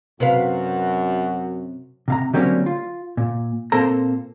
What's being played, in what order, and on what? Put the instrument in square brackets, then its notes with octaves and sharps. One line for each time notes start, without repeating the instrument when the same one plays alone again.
[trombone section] F#2 F#4 [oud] C3 B4 F5
[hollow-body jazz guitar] C3 F5 A#5
D3 F#3 G3 A#3 C4 C#4
F4
A#2
A#2 A#3 C4 A4 C5 A#5